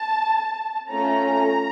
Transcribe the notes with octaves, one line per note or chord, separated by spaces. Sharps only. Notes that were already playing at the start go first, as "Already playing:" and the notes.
Already playing: A5
A3 C#4 F4 A4 A#5